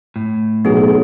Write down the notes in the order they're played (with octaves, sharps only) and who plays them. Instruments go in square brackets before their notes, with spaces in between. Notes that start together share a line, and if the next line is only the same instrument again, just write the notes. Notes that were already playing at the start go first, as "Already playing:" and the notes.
[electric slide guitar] A2
[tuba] B1 [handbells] B3 G#4